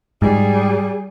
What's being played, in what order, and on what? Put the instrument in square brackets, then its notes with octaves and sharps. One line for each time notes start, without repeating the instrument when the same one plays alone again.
[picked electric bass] G#2 [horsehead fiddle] G3 G#4